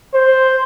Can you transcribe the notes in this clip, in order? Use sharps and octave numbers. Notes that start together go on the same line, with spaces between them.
C5